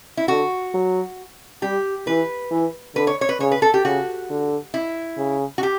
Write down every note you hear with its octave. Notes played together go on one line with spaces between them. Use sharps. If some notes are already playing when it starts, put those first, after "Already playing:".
E4
D3 F#4
F#3
G3 G4
E3 B4
E3
D3 B4
C#5
C#5
B4
C#3 C#5
B4
A4
G4
C#3 F#4
D3
E4
C#3
F#4
G4